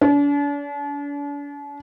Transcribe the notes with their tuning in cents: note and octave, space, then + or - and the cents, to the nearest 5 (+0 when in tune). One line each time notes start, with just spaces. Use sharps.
D4 -40